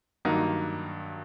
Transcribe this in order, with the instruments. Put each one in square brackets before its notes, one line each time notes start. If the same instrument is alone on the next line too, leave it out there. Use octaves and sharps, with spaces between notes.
[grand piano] G2 D#3 F#3 A#3 D#4